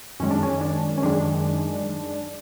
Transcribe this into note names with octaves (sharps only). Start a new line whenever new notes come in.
F#2 D#3 G#3 C#4
D4
C#4
D4
C#4
F#2 D#3 G#3 D4